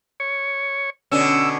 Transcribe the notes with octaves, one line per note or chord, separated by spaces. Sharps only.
C#5
B2 D3 C#4 E6